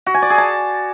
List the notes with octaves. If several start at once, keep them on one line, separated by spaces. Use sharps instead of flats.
F#4
G#5
D5
G#4
A5